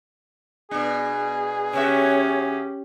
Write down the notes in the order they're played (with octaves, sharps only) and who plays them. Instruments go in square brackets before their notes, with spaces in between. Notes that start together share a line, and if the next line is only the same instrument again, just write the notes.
[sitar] B2 D4 [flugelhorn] G#4
[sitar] C#3 F#4 E5 [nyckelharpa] C#4 G4 [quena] C#5